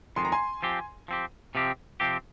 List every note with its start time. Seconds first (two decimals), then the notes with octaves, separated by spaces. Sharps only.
0.16 F2 D#3 G#3 C6
0.25 A#5
0.32 G#5 C6
0.63 F3 C4 G4
1.08 F3 C4 G4
1.55 C3 F3 C4 G4
2.00 C3 F3 C4 G4